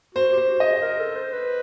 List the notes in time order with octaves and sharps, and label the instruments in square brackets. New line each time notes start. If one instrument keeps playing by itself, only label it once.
[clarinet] F#4 [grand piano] C5
[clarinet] G4
[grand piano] C5
[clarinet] F#4
[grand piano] D#5
[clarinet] G#4
A#4
A4
C5
B4